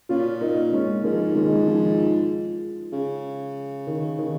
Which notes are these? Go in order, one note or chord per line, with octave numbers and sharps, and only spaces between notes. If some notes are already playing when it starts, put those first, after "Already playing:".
A#2 C#4 F4
A#3 D#4
G#3 C#4
G#2 F3 A#3
D#3 G#3
F3
C#3
D#3
D#3